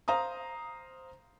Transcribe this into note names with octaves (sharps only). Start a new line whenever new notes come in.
C5 F5 A#5 D#6